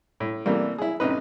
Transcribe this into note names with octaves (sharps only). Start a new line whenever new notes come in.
A2
C3 E3 G3 A3 A#3
E4 G#4
A1 C3 D#4 B4